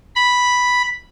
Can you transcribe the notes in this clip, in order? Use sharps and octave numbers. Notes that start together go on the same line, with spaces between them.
B5